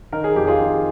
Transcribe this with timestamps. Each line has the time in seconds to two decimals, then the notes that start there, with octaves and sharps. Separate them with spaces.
0.12 D#3 A#4
0.24 G#4
0.35 F2 G4
0.47 F4 G#4
0.60 D#3